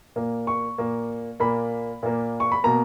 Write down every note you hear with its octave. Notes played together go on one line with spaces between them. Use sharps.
A#2 A#3
C#6
A#2 A#3
A#2 A#3 B5
A#2 A#3
C#6
B5
B2 A#3 A#5